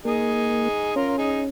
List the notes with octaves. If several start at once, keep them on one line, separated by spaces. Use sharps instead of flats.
A#3 D#4 G#4
C#4 F4 A#4
D#4 G#4